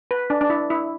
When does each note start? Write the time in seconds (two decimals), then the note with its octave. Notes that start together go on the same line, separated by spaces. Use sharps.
0.11 B4
0.30 D4
0.41 D4
0.50 E4
0.70 E4